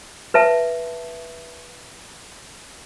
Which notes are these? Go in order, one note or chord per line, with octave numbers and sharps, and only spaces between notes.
B4 E5 A5